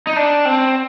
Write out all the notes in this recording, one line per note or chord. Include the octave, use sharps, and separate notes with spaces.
D#4
D4
C4